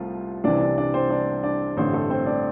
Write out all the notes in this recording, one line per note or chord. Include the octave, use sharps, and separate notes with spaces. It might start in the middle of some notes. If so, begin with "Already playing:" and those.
Already playing: C2 C3 F3 A3 F4
C2 C3 E3 D4 D5
D4 D5
D4 D5
C4 C5
D4 D5
D4 D5
A1 G2 D3 C4 C5
A3 A4
C4 C5
D4 D5